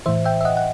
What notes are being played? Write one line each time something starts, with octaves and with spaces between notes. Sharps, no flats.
A2 E3 C5 E5
E5 G5
E5
D#5 F#5
F#5